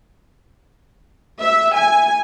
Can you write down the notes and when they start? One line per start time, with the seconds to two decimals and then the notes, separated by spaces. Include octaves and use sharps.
1.41 E5
1.76 G#5